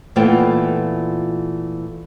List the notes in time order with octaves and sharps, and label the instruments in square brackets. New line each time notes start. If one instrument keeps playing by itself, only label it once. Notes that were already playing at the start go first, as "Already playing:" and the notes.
[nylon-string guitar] A#2 E3 A3 B3 F4 G5